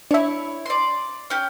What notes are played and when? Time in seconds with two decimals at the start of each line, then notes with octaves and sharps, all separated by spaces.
0.11 D4 E4 C#5 E5
0.66 D5 C6
1.30 C#4 G4